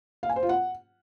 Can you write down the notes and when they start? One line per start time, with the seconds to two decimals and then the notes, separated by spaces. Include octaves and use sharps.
0.23 F5
0.29 G#5
0.36 C5
0.43 F4
0.49 F#5